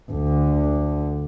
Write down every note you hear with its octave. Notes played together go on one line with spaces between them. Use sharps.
D2 D3